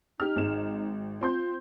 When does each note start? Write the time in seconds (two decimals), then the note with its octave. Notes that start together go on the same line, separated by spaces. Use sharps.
0.20 D#4 G4 F6
0.36 G#1 G#3 E7
1.21 C4 F4 C6 G6